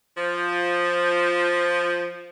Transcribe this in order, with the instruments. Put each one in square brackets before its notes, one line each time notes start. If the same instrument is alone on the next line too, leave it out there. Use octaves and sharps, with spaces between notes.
[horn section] F3